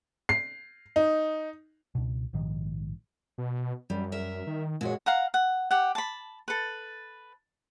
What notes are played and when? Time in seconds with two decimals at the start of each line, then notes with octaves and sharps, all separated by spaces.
0.29 C7
0.96 D#4
1.95 C#2 B2
2.33 A#1 G#2 D#3 F3
3.38 B2
3.90 F#2 G3
4.12 A#4 E5
4.47 D#3
4.81 A#2 G#3 F#4 C#5
5.06 F5 F#5 A#5
5.34 F#5
5.71 G4 F#5
5.95 A5 B5
6.48 A4 B4